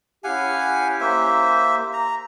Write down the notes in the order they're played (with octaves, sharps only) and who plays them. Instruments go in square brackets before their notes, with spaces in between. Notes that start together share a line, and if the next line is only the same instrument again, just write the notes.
[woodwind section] C#4 E4 G4 [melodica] F5 F#5 G#5
[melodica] A#3 C5 E5
A#5